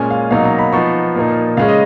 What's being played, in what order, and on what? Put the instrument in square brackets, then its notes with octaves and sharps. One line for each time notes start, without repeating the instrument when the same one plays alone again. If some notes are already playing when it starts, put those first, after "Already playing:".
Already playing: [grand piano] A#2 G#3 C#4 G#5
F5
B2 F#3 A#3 D#4 F5
A#5
B5
F3 B3 D#4 C#6
A#2 F3 A#3 D#4
C#3 G#3 C#4 F5
D#5